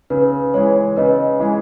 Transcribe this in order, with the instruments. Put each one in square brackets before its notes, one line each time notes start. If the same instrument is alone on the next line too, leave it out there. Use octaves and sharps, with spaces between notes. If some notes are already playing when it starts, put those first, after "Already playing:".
[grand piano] C#3 [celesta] B4
[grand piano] E3 G#3 [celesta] C#5
[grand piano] C#3 [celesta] B4 D#5
[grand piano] E3 G#3